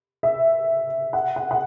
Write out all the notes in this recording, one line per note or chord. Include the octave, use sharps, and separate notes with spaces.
E5
F#5
F#5
F#5